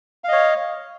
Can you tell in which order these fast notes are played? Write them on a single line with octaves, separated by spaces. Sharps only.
F5 D#5 C#5